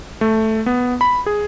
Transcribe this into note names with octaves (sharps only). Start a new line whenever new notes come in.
A3
B3
B5
G#4